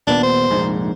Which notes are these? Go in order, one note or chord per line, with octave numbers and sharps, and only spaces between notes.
D#1 A#2 B3 D4
C5
F1 A#1 G#2